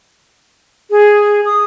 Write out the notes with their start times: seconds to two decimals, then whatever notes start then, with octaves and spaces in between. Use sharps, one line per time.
0.91 G#4
1.45 D#6